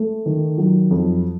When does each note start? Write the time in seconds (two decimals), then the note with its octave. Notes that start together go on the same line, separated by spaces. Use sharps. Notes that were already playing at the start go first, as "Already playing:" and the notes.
Already playing: A3
0.26 D#3
0.58 F#3
0.91 F2